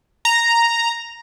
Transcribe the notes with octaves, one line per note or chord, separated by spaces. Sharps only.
A#5